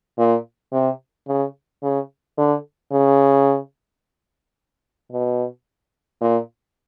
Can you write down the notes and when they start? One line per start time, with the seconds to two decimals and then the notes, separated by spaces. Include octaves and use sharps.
0.18 A#2
0.72 C3
1.27 C#3
1.83 C#3
2.38 D3
2.92 C#3
5.12 B2
6.21 A#2